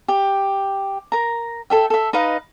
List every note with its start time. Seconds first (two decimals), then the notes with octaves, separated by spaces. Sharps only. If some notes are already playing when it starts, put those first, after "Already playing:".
0.08 G4
1.12 A#4 A#5
1.70 A4 E5 G5
1.90 A4 E5
2.13 D#4 B4 D#5 F5